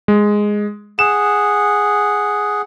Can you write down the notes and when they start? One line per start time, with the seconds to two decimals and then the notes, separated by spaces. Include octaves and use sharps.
0.08 G#3
0.99 G#4 F#5 E7